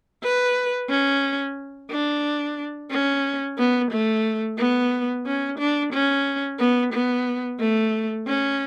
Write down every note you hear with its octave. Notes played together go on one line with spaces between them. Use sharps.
B4
C#4
D4
C#4
B3
A3
B3
C#4
D4
C#4
B3
B3
A3
C#4